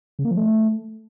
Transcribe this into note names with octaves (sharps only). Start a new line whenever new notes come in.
C#3
A#3
F3
A3